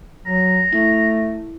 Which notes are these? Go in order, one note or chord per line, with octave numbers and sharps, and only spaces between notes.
F#3 A#5
A3 E4